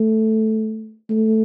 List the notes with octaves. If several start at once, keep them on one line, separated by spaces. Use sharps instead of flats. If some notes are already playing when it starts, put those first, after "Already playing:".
Already playing: A3
A3